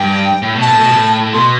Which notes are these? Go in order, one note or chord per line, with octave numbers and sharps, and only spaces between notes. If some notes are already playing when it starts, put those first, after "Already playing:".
Already playing: G2 G5
A2
B2
A5
A2
B2
A2
B2 C6